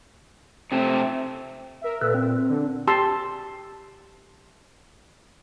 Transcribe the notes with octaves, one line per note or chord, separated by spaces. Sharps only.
C3 A3 C4
A#4 E5
A#2 A4 B4
C4
D3
G4 A5 C6 E6